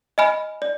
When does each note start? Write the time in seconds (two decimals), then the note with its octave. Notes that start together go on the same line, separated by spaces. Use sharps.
0.18 D#5 G#5 B5 F6
0.62 D5